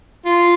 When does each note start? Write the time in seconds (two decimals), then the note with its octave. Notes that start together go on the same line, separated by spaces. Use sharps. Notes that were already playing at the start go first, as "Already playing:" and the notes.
0.25 F4